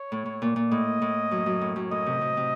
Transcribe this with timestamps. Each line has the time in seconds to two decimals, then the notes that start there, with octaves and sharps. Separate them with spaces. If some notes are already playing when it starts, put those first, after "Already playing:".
Already playing: C#5
0.12 A2
0.26 A2
0.42 A#2
0.56 A#2
0.71 A2 D#5
1.02 A2
1.31 F#2
1.46 F#2
1.61 A2
1.76 F#2
1.91 A2 D#5
2.06 C3
2.21 C3
2.37 C3